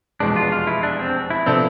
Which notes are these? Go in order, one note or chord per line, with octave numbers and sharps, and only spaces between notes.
F1 E2 B2 G#3 D4
F4
F4
E4
D4
C4
E4
C3 F3 B3 C4 D4 A4